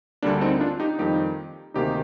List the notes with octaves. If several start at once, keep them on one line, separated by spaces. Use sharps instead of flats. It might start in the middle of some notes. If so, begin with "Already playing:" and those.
D2 D3 G3 A#3 D4
C4 D#4
D4 F4
D#4 G4
F2 D#3 G3 A#3 D#4 G4
D2 C3 D#3 A#3 D#4 G4